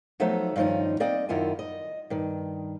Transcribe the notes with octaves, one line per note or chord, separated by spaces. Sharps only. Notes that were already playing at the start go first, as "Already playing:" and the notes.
F3 F#3 A3 B3 D#4 E5
G2 D#3 F3 C#4 D#4
A#3 C4 D5 D#5 G5
F#2 D#3 E4 F4 G#5
D#5
G2 D#3